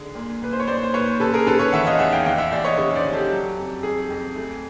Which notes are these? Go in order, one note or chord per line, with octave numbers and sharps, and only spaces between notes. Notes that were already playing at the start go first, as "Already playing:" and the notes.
Already playing: D3 G#4
A#2
A#2 B4
C5
C#5
A#2 C5 D5
C5
A#2 B4 C#5
C#3 A4 B4
G#4 A#4
C#3 A4 B4
B4 C#5
E3 E5 F#5
D#5 F5
E2 E5 F#5
F5 G5
E3 F5 G5
E5 F#5
E2 D5 E5
C#5 D#5
C#3 C#5 D#5
C5 D5
C#3
G4 A4
F#3
F2
F2 G#4
F2
A3